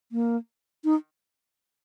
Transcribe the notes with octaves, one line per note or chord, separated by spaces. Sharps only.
A#3
D#4